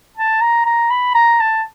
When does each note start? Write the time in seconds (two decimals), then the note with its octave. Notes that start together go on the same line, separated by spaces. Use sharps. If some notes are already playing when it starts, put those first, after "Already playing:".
0.17 A5
0.41 A#5
0.66 A#5
0.91 B5
1.15 A#5
1.40 A5